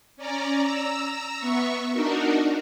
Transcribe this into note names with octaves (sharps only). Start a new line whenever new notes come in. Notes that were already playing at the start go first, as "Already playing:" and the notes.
C#4 D5 A#5
A#5 E6
B3 E5 C#6
D4 D#4 F#4 A#4